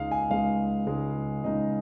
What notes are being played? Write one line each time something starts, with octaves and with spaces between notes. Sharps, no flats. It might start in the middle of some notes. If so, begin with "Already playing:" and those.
Already playing: C#2 C#3 G#3 D#4 F5
G#5
C#2 C#3 G#3 D#4 F5
C#2 C#3 G#3 D#4
C#2 C#3 G#3 D#4 D#5